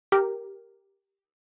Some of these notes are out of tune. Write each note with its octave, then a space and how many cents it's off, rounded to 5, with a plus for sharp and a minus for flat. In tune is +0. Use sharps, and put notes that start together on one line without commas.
G4 +0 A#4 +0